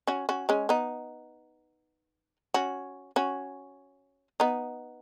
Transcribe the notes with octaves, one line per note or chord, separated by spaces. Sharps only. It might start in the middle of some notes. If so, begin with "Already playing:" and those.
C#4 F#4
C#4 F#4
G#3 C#4
B3 D#4
C#4 F#4
C#4 F#4
B3 D#4